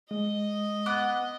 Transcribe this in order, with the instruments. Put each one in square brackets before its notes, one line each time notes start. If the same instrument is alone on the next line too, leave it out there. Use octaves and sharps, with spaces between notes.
[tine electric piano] G#3 [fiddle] D#5
[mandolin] B3 F#5 D6